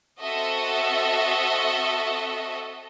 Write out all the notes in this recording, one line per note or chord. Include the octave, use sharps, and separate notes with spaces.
C4 F#4 A4 D#5 E5